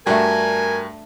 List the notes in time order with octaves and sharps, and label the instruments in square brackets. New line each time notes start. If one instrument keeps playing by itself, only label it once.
[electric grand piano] G2 F#4 G5 [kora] A3 D4 [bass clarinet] A#4 [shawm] G#5